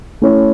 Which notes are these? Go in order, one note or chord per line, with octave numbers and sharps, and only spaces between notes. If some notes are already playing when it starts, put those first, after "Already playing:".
A3 C#4 E4 A4 C#5